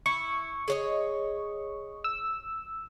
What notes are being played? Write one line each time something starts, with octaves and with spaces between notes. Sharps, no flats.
E4 C#6
G#4 C#5 D#5
E6